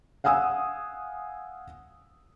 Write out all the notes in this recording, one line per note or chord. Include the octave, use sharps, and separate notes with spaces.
F5 F#5 G#5 D#6 E6